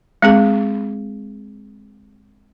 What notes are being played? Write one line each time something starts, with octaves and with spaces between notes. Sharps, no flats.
G#3 C4 G#4